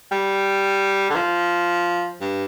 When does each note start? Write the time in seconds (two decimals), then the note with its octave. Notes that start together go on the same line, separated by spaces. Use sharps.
0.12 G3
1.10 D3
1.15 F3
2.21 G2